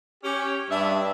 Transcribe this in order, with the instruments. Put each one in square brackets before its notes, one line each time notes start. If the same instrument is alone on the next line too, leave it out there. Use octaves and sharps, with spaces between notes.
[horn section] C#4 G4
[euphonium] G2 [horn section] D4 D#5 E5